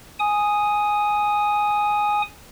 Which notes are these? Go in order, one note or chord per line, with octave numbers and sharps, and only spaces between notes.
G#5 D#6